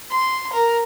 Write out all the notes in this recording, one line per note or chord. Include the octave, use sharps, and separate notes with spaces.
C6
A#4